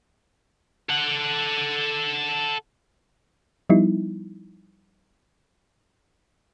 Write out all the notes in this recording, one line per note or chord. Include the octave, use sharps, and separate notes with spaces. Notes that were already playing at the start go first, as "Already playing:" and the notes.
A4 F#5
F3 G3 B3 D#4 E4